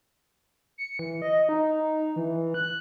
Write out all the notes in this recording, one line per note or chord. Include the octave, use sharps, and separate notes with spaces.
C#7
E3
D#5
D#4
E3
F#6